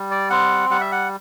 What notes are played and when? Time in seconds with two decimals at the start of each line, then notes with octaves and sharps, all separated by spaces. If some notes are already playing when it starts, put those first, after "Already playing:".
Already playing: G3
0.11 D5
0.30 C4 F#5
0.70 G3 F#5
0.81 E5
0.92 F#5